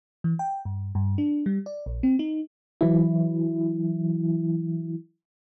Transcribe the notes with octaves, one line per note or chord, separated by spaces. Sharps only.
E3
G5
G2
G2
D4
G3
D5
A#1
C4
D#4
E3 F#3 E4